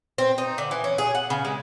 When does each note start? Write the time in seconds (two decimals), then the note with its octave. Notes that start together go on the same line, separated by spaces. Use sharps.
0.18 C4
0.38 D#4
0.58 D3
0.71 E3
0.84 C#4
0.98 G#4
1.15 F#5
1.30 C#3
1.45 G#3